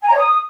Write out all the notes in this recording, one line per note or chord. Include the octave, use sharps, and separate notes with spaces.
G#5
A#5
C#5
D#6